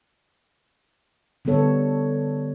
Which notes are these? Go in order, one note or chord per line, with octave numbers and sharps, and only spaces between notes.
D3 G3 B3 A4 C#5